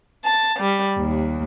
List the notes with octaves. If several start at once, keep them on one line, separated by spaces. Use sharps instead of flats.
A5
G3
D#2